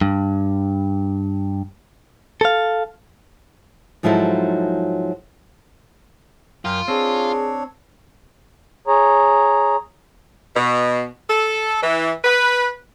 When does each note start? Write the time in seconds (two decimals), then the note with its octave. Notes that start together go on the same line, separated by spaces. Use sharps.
0.01 G2
2.41 A4 F5
4.03 G#2 F3 F#3 D#4 E4 A4
6.65 F#2 F4 A#4 G5
6.88 C4 D4 G#4 C#5
8.87 G#4 C#5 A#5
10.56 B2
11.30 A4
11.83 E3
12.24 B4